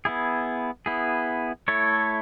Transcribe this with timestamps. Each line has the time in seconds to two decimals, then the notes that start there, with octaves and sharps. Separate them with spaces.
0.05 B3 E4 G#4
0.86 B3 E4 G#4
1.68 A3 E4 A4 C#5